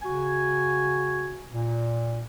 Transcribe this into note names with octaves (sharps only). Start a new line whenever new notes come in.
C#3 F#4 G#5
A#2